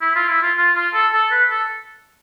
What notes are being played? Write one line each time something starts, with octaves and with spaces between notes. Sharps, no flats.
E4
F4
E4
F4
F4
F4
A4
A4
B4
A4